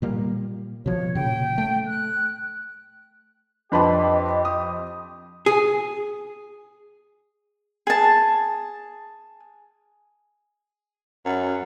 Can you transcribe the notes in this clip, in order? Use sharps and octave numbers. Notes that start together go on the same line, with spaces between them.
A#2 G3 A#3
B2 F3 C#5
A#2 C#3 G5
A3
F#6
F2 D4 G4 B4 D#5 A5 B5 C6
D#6
G#4
G#4 A5
F#2